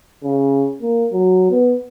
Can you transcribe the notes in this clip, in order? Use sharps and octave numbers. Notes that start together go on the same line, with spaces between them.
C#3
A#3
F#3
B3